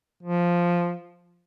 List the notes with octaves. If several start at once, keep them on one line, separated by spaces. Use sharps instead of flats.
F3